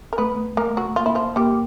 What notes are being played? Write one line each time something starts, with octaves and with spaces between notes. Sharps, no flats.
A#4
A3 B3 B4
A3 A#3 A#4
F#3 F#4
A#3 F4
E4
F3 F4
G3 A#3 G4